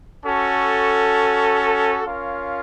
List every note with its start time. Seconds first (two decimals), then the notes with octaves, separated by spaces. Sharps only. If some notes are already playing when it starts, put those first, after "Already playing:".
0.24 C#4 F#4 A4
2.05 C#4 F4 A#4 C#5 F5